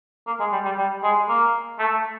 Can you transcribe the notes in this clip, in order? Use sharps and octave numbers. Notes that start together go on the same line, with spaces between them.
A#3
G#3
G3
G3
G3
G#3
A#3
A3